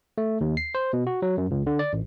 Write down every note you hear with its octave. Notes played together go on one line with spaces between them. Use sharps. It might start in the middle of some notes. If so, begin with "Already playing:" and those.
A3
D#2
C7
C5
B2
F#4
F#3
F#2
C#2
D3
D5
A1